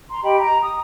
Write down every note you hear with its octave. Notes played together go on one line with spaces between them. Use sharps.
A#5 C6
G4 D#5 G5 B5
A#5
D#6